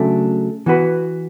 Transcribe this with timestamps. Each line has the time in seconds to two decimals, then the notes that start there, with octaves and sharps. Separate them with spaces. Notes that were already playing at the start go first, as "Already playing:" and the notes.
Already playing: C#3 F#3 A3 D4 A4
0.66 E3 B3 F#4 B4